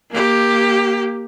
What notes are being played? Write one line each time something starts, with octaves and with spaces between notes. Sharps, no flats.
A#3 G4